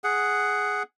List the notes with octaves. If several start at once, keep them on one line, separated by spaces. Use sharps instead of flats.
G#4 F#5